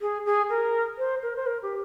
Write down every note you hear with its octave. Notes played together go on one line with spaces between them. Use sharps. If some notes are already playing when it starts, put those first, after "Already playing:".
G#4
G#4
A#4
C5
A#4
C5
A#4
G4